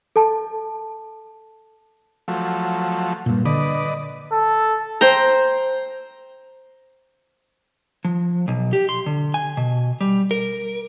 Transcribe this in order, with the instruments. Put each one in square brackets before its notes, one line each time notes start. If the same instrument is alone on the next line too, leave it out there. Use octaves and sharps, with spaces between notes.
[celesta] A4 A5
[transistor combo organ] F3 F#3 A3
[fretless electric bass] G2 A#2
[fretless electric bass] D3 [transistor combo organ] B4 D5 D#5
[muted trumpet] A4
[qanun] C5 G5 A#5
[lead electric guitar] F3
B1
G4
C6
D3
G#5
B2
G3
A#4